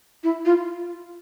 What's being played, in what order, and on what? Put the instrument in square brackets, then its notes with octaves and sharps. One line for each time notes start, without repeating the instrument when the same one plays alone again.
[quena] E4
F4